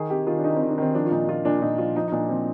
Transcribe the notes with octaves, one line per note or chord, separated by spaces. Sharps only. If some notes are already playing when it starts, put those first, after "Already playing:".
Already playing: D#3 G#4
C3 G4
D#3 F4
D4
D#3 D#4
D#3 C4
D4
D#3 C4
F3 D4
F4
A#2 D#4
A#2 F4
A#2 D4
A#2 D#4
F3 F4
F3 D#4
D#4
A#2 D4
F3 C4